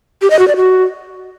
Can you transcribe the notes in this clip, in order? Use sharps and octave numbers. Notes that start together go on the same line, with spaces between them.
G4
D#5
F#4
D5
F#4